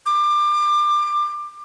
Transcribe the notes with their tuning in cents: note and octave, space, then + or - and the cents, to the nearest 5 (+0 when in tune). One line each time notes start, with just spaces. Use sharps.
D6 +25